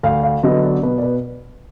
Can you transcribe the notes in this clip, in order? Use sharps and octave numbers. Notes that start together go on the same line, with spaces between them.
D2 F5
F5
D3 F#3 B3 D#5
D5
B2 B4
D5
B4